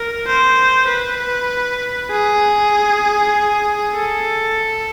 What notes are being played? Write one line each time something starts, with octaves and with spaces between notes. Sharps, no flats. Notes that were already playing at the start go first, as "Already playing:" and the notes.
Already playing: A#4
C5
B4
G#4
A4